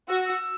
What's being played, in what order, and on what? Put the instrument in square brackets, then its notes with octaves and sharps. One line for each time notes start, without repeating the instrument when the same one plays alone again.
[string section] F#4 [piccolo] E6
[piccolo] E6